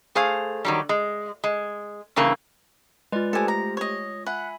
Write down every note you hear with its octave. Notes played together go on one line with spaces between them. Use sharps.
A3 G#4 C5 F5
D#3 F#3 G3
G#3
G#3
G2 C#3 E3 A#3
G#3 F4 B4 D5
A3 G4 A4 C5 G#5
A#5
C#5 D#5
E5 F#5 G#5 B5